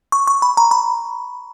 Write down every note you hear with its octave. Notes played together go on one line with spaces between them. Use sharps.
C#6
C#6
B5
A#5
B5